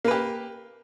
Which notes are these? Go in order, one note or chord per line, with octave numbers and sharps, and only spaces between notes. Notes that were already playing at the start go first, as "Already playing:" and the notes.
A#3 G4 B4